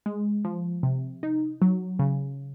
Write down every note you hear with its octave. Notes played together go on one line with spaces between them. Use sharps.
G#3
F3
C3
D#4
F#3
C#3